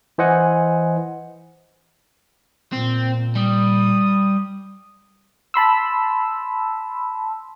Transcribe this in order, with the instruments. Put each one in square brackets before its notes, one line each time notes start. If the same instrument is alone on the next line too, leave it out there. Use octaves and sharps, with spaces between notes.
[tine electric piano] E3 C5 D#5 F#5 G#5
[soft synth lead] A#2 [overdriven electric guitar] C4
[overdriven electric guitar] G3 [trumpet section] D#6
[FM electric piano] A5 B5 C6 E6